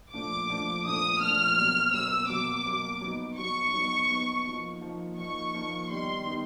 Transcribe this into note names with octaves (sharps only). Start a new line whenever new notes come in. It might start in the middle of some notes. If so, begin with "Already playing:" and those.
A#2 F3 A3 D4 D6
A#2 F3 A3 D4
A#2 F3 A3 D4 D#6
A#2 F3 A3 D4 F6
B2 F#3 A#3
B2 F#3 A#3 E6
B2 F#3 A#3 D6
B2 F#3 A#3
F#3 B3 D#4
F#3 B3 D#4 C#6
F#3 B3 D#4
F#3 B3 D#4
F3 A#3 D#4
F3 A#3 D#4
F3 A#3 D#4 C#6
F3 A#3 D#4
D#3 G3 B3 D#4 C6
D#3 G3 B3 D#4